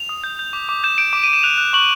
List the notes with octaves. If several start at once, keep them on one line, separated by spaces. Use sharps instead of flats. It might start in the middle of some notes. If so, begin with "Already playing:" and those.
Already playing: F7
D#6
G6
G6
D6
D6
G6 E7
G6 D7
D6 D7
D6 D#7
E7
F#6 F7
F#6
C#6 F#7